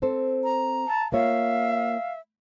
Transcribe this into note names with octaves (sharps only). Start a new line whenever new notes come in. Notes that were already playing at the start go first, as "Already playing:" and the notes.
C4 A4 C5
A#5
A5
A#3 F4 C#5 E5 F5